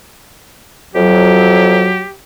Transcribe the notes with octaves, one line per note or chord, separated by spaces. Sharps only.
F2 F#3 G4